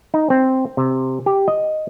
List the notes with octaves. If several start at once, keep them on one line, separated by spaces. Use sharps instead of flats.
D#4
C4
C3
G4
D#5